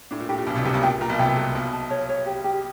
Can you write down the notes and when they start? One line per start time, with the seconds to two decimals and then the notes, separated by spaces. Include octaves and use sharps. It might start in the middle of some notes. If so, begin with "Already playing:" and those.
0.11 A2 D4
0.20 A#2
0.29 A2 G4
0.38 A#2
0.47 B1 B2 D4
0.55 C2 C3
0.65 C#2 C#3 G4
0.74 B1 B2
0.82 A#2 G5
1.01 A#2 A#5
1.09 B1 B2
1.19 C2 C3 G5
1.37 B4
1.55 B1 B2 E5
1.73 A5
1.90 C#5
2.09 C#5
2.26 G4
2.44 G4